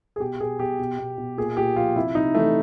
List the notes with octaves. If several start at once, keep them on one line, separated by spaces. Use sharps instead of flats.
G#4
B2 G4
B2 G#4
B2 G4
B2
B2
B2
A#2 G#4
A#2 G4
F3 F4
C3 E4
C3 D#4
E3 A3